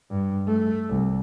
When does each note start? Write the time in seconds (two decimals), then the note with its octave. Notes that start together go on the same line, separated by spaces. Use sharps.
0.10 G2
0.47 A3
0.90 C2